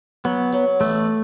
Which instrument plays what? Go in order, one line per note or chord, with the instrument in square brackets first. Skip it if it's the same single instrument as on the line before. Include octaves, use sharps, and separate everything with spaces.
[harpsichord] F#3 [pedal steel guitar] B3
[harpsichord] F#3
[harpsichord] A1 [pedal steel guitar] A3